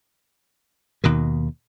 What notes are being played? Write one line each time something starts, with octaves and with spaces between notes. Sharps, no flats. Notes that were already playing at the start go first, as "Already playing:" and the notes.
D#2 B2 D#3